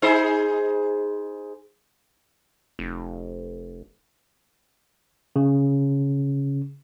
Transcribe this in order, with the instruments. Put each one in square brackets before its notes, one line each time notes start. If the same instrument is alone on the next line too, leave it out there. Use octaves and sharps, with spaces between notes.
[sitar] D#4 G#4 C5
[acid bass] F1
[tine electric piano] C#3